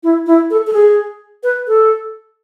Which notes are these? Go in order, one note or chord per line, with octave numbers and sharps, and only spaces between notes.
E4
E4
A4
A4
G#4
B4
A4